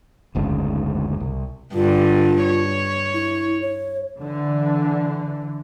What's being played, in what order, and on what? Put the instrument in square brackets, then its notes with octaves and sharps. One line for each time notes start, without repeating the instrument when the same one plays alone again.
[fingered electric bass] F#1 D2 G#2 C#3
C2
[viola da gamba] G2 D3 [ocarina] F4
[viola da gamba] C#5
[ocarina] E4
C#5
[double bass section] D3 E3